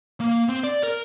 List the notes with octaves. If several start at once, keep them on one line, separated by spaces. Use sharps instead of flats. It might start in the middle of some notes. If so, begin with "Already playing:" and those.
A#3
C4
D5
A#4